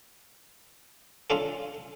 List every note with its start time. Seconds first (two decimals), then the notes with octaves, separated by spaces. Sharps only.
1.30 C#4 D4 F4 A4